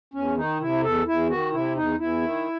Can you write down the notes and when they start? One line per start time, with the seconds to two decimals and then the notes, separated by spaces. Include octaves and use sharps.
0.14 E2 C#4
0.37 D#3 D#4
0.60 C3 E4
0.83 E2 A4
1.07 E2 E4
1.29 D#3 F#4
1.52 C3 E4
1.75 E2 D#4
1.98 E2 E4
2.22 D#3